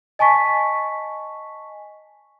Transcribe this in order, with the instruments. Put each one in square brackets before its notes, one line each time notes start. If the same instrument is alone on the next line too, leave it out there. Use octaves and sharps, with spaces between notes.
[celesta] D#5 G#5 A5 C#6 B6